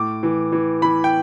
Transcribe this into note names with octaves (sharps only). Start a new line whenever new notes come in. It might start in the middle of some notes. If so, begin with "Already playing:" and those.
Already playing: A2 D6
E3
E3
E3 B5
G5